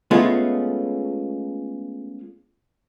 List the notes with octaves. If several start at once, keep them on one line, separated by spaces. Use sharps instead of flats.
G#3 A3 B3 C#4 F4